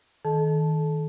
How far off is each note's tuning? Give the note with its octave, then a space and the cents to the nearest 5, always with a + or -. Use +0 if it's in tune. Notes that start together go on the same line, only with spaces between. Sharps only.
D#3 +10 A4 -35 A5 -10